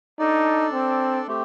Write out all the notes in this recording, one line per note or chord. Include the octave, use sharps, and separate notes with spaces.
D4 D#4 A4 D5
C4
A3 C4 G4